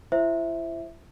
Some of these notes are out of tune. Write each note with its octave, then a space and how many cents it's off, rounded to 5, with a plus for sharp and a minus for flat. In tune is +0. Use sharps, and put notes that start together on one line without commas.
E4 +35 C5 +0 E5 +0